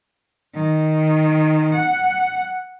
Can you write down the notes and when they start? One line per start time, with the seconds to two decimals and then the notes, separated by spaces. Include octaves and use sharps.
0.55 D#3
1.74 F#5